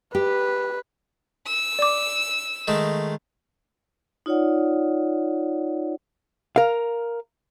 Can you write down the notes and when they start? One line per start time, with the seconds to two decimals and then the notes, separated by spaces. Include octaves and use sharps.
0.15 G4 B4
1.47 E6
1.79 D5 D6
2.68 D#3 G#3 A3
4.26 D#4 F4 C#5 D5 F#5
6.56 A#4 F5